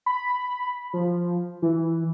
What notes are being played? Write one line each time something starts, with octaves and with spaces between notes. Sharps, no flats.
B5
F3
E3